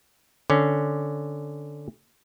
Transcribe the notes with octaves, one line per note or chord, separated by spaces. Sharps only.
D3 C#4